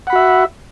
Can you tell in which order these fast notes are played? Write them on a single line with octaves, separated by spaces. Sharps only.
F#5 B5 F#4 E5